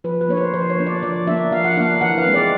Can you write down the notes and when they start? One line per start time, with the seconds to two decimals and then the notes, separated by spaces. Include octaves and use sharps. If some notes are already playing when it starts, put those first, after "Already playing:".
0.04 F3 B4
0.21 B4
0.29 A#3 D4 C#5
0.37 C5
0.53 F3 C5
0.70 C#5
0.78 A#3 D4
0.86 D5
1.03 F3 D5
1.27 A#3 D4 E5
1.52 F3 F5
1.64 F#5
1.77 A#3 D4 F5
2.01 E3 F#5
2.18 F5
2.27 G#3 C4
2.34 D5